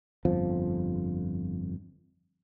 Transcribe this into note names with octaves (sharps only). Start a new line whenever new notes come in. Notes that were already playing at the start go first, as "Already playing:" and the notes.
G1 F2 F3